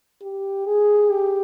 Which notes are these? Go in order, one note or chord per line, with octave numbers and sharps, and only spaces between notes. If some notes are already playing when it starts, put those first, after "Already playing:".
G4
G#4
G4